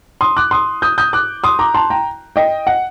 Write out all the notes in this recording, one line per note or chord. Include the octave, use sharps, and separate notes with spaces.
C6 D#6
D6 F#6
C6 D#6
D#6 G6
D#6 G6
D6 F#6
C6 D#6
A#5 D6
A5 C6
G5 A#5
D#5 G5
F#5